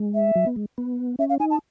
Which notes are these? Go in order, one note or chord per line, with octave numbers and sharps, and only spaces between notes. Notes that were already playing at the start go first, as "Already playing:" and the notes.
Already playing: G#3
E5
F#3
B3
G#3
B3
C#4 E5
F5
D#4 G#5
A5